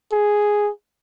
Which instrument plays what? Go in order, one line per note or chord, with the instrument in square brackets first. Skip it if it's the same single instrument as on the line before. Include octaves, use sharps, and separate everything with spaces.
[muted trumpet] G#4